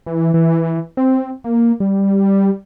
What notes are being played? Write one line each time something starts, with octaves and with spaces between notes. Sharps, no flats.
E3
E3
C4
A#3
G3